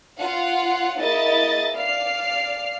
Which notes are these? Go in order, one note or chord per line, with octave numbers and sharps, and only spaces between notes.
F4 F5 F#5
A#3 E4 G#4 D#5 A6
D5 F5 F6 C7